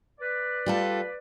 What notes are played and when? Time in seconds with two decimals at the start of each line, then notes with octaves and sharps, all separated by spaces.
0.20 B4 D5
0.66 G3 F4 A4